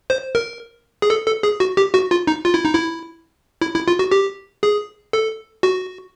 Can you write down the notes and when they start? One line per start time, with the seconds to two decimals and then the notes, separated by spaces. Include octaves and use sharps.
0.10 C5
0.35 A#4
1.02 G#4
1.10 A4
1.26 A4
1.43 G#4
1.60 F#4
1.77 G4
1.94 F#4
2.11 F4
2.27 D#4
2.45 F4
2.54 E4
2.65 D#4
2.75 E4
3.61 E4
3.75 E4
3.88 F4
3.99 F#4
4.12 G4
4.63 G#4
5.13 A4
5.63 F#4